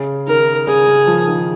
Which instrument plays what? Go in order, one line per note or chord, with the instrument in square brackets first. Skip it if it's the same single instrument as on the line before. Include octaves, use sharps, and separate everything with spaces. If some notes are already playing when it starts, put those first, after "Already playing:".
Already playing: [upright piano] C#3
[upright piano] D#3 [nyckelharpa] A#4
[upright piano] C#3 [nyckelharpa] G#4
[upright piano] C#3
F3
D#3